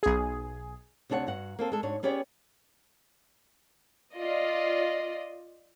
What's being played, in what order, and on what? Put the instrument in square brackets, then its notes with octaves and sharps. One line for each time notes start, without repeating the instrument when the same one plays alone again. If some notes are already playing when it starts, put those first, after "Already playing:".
[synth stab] B1 G#4
[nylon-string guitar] D2 C3 D4 G4 C#5 F#5
G2 F#4 F#5
A#3 C4 A4
G#3 A4
G#2 D4 F#4 C#5
B3 C#4 G4 G#4 C#5 D5
[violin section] F4 D5 D#5